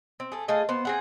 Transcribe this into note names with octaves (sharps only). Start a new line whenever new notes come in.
C4
A3 G#4
A3 F4 G#4 D#5
B3 C5
C4 G#4 F#5